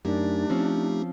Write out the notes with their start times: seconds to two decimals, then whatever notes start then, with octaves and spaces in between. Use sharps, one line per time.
0.05 F#2 A3 D4 D#4 G4
0.50 F3 C4 C#4